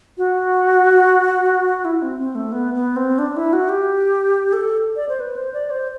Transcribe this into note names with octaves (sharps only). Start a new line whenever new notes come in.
F#4
E4
C4
C4
A3
B3
B3
C4
D4
E4
F#4
G4
A4
D5
C5
B4
C5
D5
C5